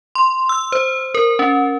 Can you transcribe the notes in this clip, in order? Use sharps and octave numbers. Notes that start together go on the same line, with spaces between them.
C6
E6
C5
A#4
C#4